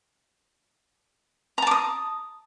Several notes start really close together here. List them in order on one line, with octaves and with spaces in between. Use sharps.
A#5 A5 D6 D#6